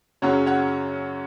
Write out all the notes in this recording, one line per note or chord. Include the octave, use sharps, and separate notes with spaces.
F#2 C#3 F#3 C#4 C#5 F#5
C#5 F#5